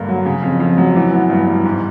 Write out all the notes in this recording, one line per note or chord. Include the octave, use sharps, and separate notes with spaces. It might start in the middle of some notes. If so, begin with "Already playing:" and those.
Already playing: G2 D3 A#3
F#3
C#3
F2
F2
F#3
E3
B3
G2
G3
G#2